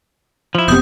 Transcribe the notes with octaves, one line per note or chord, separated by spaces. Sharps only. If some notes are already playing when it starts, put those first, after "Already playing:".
F3 E4
F1 C3 B3 D#6 G6